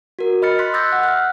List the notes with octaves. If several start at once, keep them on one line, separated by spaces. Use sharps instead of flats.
F#4 A#4
D#5 B5 F6 A6 C#7
C6 F#6 A6 B6
D6 E6 F#6 G6 A6 A#6
F#5 F#6
F6 F#6